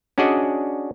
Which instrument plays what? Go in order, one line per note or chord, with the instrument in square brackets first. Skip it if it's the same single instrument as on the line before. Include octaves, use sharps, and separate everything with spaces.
[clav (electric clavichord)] C#4 D4 F#4 G#4 D5 D#5